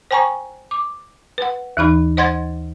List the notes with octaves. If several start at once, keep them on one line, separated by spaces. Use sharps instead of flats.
C5 G5 G#5 A#5 C#6
D6
B4 F#5
D#2 E3 D#4 B5
C5 D#5 F#5 C6 G#6 A6